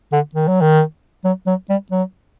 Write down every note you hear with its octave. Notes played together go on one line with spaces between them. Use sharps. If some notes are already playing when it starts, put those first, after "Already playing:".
D3
D#3
F#3
D#3
F#3
F#3
G3
F#3